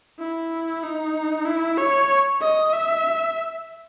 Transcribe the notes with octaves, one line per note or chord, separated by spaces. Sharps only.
E4
D#4
E4
C#5
D#5
E5